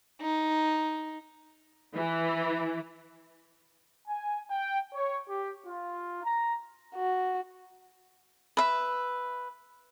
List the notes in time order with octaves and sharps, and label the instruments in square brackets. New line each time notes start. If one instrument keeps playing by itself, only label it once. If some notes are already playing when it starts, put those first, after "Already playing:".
[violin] D#4
[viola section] E3
[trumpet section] G#5
G5
C#5
G4
F4
A#5
[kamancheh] F#4
[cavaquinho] B4 E5